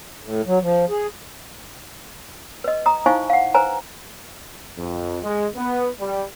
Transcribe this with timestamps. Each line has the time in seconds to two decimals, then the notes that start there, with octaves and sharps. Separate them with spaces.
0.22 A2
0.46 F#3
0.61 F3
0.90 G#4
2.64 B4 D#5
2.86 A#5 D#6
3.06 D#4 E4 C5 F5 G#5 C#6
3.30 F5 F#5
3.54 B4 C5 G#5 A#5
4.78 F2
5.23 G#3
5.56 B3
5.99 G3